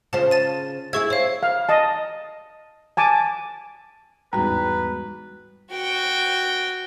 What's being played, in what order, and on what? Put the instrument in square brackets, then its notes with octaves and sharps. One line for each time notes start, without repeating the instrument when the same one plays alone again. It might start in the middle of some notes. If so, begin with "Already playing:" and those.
[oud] C#3 F4 C5 [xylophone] A5
[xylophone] A5 A6 D#7
[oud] E4 G#4 E5 [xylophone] C#6 G#6
[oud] C4 [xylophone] C#5 F5
[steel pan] F5
D#5 A5
G#5 A5 D6
[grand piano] E2 G#2 [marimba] G3 F#4 [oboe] B4 [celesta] A#5
[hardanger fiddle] F#4 G5